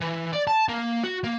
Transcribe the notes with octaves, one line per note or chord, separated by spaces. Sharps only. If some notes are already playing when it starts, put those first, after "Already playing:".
E3
D5
A5
A#3
F#4
A#3